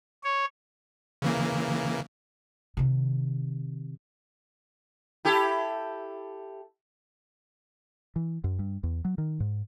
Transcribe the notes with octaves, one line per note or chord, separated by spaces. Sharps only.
C#5
C#3 E3 A#3
C3 D#3
E4 G4 A4
E3
F#2
G2
E2
F#3
D#3
G#2